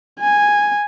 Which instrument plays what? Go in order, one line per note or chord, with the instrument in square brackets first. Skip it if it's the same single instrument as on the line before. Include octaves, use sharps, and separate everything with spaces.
[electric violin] G#5